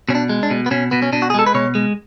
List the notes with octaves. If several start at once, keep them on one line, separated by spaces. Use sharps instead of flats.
B2 C#4
D4
G#3
D4
B2
B3
B2 C#4
B2 B3
C#4
B2 D4
F#4
G#4
G#3 A4
B4
B2 C#5
G#3